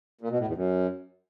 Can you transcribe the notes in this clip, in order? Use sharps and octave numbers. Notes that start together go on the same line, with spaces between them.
A#2
B2
A2
E2
F#2